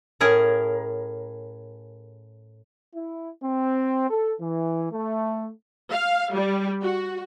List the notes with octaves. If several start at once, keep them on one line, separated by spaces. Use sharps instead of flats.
A2 C#4 G#4 A#4
E4
C4
A4
E3
A3
F5
G3
F#4